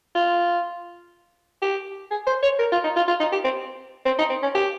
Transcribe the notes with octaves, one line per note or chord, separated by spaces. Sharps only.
F4
G4
G#4
C5
C#5
A#4
F4
D#4
F4
F4
D#4
G4
C4
C4
D#4
C4
C#4
G4